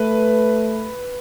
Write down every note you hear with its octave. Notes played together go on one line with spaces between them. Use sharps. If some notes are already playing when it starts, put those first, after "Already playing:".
Already playing: A3 B4